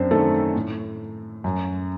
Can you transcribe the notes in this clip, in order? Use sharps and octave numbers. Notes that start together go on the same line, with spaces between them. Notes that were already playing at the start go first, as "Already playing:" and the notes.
Already playing: F#2 C4 D4 C5
D#3 A3 A4
A2
F#2